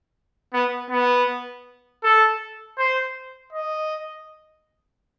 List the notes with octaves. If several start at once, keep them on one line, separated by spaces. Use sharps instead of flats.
B3
B3
A4
C5
D#5